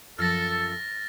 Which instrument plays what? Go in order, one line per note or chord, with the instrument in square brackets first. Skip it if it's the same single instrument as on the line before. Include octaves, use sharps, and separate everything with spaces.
[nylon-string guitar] F#2 F3 [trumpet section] A4 [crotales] F6 A6 A#6